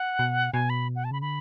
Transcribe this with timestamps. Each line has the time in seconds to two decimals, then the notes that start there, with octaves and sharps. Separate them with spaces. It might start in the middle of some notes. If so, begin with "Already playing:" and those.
Already playing: F#5
0.19 B2
0.53 B2 G#5
0.70 B5
0.96 F#5
1.04 A5
1.11 C#3 B5
1.22 D3 B5